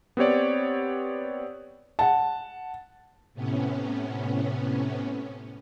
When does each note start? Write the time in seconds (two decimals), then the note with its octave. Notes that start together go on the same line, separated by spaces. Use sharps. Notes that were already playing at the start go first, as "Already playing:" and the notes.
0.17 B3 C4 G4 C#5 D5
1.99 F#5 A5
3.34 A2 C3 B3 C#4